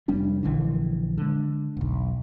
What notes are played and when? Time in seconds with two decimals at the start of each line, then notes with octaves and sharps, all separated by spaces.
0.08 F1 G3 C#4 D4
0.43 A#1 D3 E3
1.18 D3 G#3
1.77 E1 B1